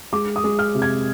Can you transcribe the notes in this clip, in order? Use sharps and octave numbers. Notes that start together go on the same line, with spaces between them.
G#3 D6
D#6
G#3
F6
C3
G#6